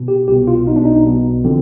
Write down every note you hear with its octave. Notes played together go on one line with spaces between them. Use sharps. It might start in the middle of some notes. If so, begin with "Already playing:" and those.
Already playing: B2
G4
C2 B2 G4
F4
B1 B2 D#4
D4
D#4
B1 B2
D3 F3 C4